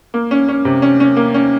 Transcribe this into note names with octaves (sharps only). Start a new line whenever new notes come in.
A#3
C#4
C#4
C3
C#4
C#4
A#3
C#4